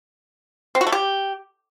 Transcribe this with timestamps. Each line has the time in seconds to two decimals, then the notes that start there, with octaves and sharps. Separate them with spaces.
0.75 C4
0.81 F#4
0.87 A3
0.92 G4